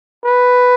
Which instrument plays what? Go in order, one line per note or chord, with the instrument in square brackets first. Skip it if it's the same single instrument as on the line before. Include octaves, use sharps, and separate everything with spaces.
[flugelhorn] B4